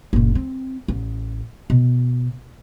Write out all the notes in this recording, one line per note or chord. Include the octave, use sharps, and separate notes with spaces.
F#1 A#2
C4
A1
B2